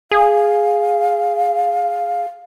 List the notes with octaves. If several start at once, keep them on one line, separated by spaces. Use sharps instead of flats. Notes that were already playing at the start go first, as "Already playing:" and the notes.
G#4 F5